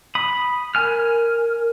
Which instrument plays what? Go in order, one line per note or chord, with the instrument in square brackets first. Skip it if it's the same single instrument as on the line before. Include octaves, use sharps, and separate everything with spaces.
[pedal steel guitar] B5 D#6
[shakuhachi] A#4 [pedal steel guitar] G#5 F6